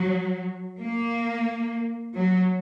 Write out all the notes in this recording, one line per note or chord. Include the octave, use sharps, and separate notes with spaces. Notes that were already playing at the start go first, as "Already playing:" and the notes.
Already playing: F#3
A#3
F#3